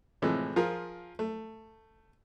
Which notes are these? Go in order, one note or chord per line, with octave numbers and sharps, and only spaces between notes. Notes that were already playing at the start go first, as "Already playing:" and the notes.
A2 C3 E3 F3 G#3 A3
F3 F4 G#4 A#4
A3